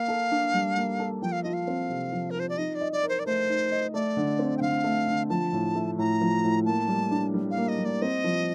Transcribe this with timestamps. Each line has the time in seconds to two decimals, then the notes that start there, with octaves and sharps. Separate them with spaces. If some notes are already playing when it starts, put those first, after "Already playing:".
Already playing: A#3 F5
0.08 A4
0.31 D4
0.54 G3
0.77 A#3
0.99 A4
1.22 F3 G5
1.32 F5
1.43 F4 D#5
1.53 F5
1.67 C4
1.90 C3
2.12 F3
2.30 A#4
2.35 F4 C5
2.49 D5
2.58 D#4 D#5
2.75 D5
2.81 D#5
2.92 D5
3.03 A#4
3.09 C5
3.19 D5
3.26 A3 C5
3.49 D#4
3.72 D#5
3.94 A3 D5
4.17 D3
4.39 C4
4.57 G5
4.61 D3 F5
4.84 A3
5.08 D3
5.29 F3 A5
5.53 A2
5.75 A3
5.98 A2 A#5
6.21 F3
6.44 A2
6.65 A#3 A5
6.88 G3
7.11 D4
7.34 G3
7.51 F5
7.57 A#3
7.68 D#5
7.79 G3
7.85 D5
8.02 C4 D#5
8.24 F3